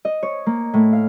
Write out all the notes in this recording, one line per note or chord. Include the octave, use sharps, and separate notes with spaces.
D#5
C#5
A#3
A2
F5